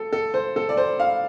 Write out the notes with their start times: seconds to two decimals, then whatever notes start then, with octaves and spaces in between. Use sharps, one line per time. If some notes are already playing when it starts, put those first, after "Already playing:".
Already playing: A4
0.13 A4
0.34 C5
0.56 A4
0.69 D5
0.77 C5
1.00 F5